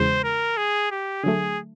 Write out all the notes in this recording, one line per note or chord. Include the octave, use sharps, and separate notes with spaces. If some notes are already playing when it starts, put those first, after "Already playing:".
Already playing: E2 C#3 E3 G#3 C5
A#4
G#4
G4
D3 F#3 A3 G#4